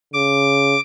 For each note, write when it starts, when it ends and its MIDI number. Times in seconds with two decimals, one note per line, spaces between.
0.14 0.75 49
0.14 0.80 86